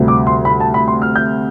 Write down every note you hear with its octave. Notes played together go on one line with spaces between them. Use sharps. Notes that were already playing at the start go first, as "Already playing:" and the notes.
Already playing: D2 C3 G3
D6
C6
B5
A5
B5
C6
F6
G6